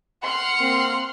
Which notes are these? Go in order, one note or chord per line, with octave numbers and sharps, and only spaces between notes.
F#5 C6 F6
A#3 C4